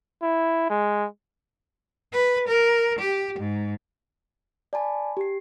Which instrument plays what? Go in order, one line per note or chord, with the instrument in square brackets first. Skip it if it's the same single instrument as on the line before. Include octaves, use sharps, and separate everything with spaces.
[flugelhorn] E4
G#3
[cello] B4
A#4
G4
G#2
[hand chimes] D5 G#5 A5 B5
G4 C7